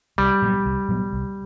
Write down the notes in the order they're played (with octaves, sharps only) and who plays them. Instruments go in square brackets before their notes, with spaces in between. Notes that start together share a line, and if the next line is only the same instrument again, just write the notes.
[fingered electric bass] C2 [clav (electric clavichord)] G3
[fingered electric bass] A#2 F#3 B3
C2
A#2 F#3 B3
C2